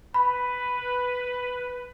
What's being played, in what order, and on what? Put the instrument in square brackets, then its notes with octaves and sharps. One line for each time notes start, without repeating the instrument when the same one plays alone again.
[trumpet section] B4 [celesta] B5